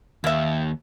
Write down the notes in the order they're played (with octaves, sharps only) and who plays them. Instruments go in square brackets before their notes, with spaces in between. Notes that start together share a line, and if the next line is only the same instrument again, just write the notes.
[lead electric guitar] D#2 [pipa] A#3 E5